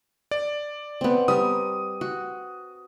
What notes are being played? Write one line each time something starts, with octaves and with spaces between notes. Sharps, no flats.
D5
B3 C4
G3 A#4 D#6
F#4